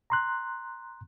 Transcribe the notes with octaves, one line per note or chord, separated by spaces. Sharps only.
A#5 C6 F#6